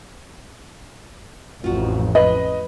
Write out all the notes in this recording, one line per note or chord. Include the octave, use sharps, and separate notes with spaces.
A1 F2 F4 F#4
B4 D#5